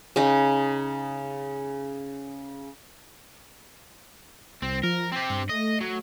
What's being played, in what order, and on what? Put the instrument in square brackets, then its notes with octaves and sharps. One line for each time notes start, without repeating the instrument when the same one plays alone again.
[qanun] C#3 D#4
[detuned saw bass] C2 [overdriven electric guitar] C4
[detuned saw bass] F3 [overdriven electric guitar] A#4
[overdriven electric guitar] C4 G4
[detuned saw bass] G2
[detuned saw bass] A3 [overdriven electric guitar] D#5
[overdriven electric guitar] F#3